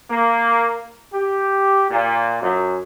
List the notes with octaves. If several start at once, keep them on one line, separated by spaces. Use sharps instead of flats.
A#3
G4
A#2
F#2